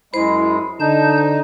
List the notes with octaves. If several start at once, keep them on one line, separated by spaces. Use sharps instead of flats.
F#2 G#3 E4 C5
D3 D#4 A5 G6